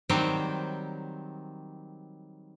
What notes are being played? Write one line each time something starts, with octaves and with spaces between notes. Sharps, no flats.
D#3 F#3 G3 C4 C5